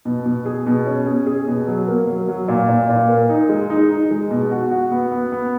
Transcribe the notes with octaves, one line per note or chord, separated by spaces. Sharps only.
B2
B2
G#4
B2
C#4
G#4
G#4
B2
F#3
A#3
F#3
F#3
A#2
A#2
A#2
A#3
D#4
G#3
D#4
D#4
G#3
B2
F#4
F#4
B3
B3
B3